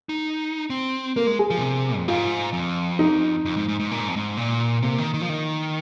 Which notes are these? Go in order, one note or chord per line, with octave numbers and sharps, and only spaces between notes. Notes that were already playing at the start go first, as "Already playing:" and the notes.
D#4
C4
A#3 A#4
G#3
G#4
F3
A#2
C3
F2
G#2 F4
F2
D#4
F2
G#2
G#2
G#2
A#2
G#2
F2
G#2
A#2
C3 A#3
D#3
D#3
F3
D#3